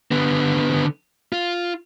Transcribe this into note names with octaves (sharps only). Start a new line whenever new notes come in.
D3 B3
F4